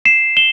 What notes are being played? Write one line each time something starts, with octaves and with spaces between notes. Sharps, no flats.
C7 E7
E7 G7